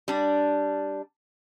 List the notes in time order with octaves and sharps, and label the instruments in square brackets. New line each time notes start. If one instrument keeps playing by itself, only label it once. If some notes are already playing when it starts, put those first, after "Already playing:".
[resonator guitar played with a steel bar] G3 D4